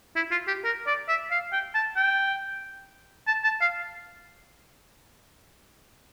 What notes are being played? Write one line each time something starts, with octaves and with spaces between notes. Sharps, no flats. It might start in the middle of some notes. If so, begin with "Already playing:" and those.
E4
F4
G4
A#4
D5
E5
F5
G5
A5
G5
A5
A5
F5